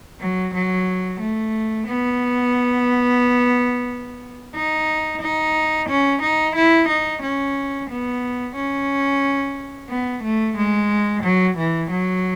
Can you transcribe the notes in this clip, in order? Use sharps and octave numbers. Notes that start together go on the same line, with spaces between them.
F#3
F#3
A3
B3
D#4
D#4
C#4
D#4
E4
D#4
C#4
B3
C#4
B3
A3
G#3
F#3
E3
F#3